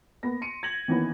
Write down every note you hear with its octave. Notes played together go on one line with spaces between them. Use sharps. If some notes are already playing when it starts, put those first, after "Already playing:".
A#3 B3 A#6
C6 C#7 D#7
G#6 A#6 F#7
D#3 E3 A#3 B3 C#4